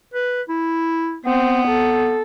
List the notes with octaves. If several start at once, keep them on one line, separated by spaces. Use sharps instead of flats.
B4
E4
B3 C4
A4